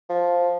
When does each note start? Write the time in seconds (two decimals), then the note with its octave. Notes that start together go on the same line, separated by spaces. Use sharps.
0.10 F3